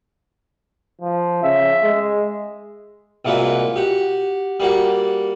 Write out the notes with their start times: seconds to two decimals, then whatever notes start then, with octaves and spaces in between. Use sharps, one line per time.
1.02 F3
1.43 C#3 E5
1.83 G#3
3.25 C2 A#2 G#3 A#3 F#4 B4
3.76 F#4 G4
4.60 G3 A#3 F#4